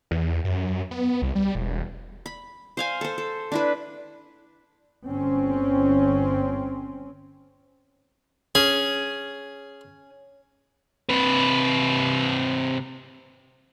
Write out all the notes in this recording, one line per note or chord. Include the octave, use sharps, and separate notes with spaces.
E2
F#2
B3
C2
G3
E1
B5
C5 F5 G#5
A4 C5
A4
D4 E4 B4
G1 C4 C#4
C#4 G#4
C3 B4